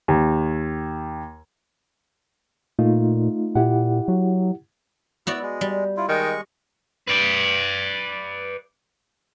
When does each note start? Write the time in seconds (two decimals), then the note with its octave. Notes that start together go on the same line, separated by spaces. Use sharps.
0.08 D#2
2.79 A#2 A3 D#4 F4
3.55 A#2 E4 G4 F#5
4.08 F#3
5.27 B3 E4 F#4 D5 E6
5.42 G#3
5.61 G3
5.97 E4 F4
6.09 D#3 G#3 C#6
7.07 B4 D5